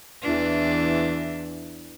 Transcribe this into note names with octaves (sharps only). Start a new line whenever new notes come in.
E2 E3 D4